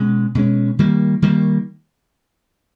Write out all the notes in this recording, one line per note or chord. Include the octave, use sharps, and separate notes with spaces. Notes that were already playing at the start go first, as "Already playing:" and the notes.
Already playing: B2 G#3 C#4
B2 G#3 C#4
D#3 G3 A#3
D#3 G3 A#3